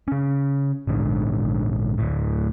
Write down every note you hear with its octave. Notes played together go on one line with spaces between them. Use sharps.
C#3 C#4
A#1 G#2 D3
D2 A2